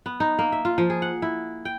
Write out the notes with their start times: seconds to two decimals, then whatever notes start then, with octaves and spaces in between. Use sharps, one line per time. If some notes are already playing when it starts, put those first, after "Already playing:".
0.06 B3
0.20 D#4
0.39 A#3
0.52 E5
0.65 F4
0.78 F3
0.90 G#4
1.02 F#5
1.22 E4
1.65 G5